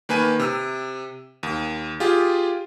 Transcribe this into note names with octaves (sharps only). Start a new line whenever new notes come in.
D#3 A#3 B4 G#5 D#7
C3 E6
D#2
F4 G4 G#4